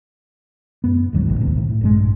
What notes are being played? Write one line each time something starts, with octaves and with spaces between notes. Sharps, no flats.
F#2 B3
G#1 D2 F#3
A#1 A2 E3
E1 C2 C3 D#3
A2
A#1 G2 G#3